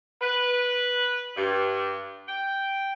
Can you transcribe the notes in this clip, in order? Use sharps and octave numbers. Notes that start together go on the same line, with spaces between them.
B4
G2
G5